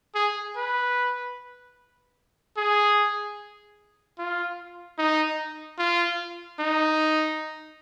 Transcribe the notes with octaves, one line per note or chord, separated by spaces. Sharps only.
G#4
B4
G#4
F4
D#4
F4
D#4